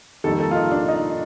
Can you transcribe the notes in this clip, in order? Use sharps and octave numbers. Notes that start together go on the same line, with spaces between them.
F2 D#3 G3 A#3 A4
A4
F4
D#4
D4
D#4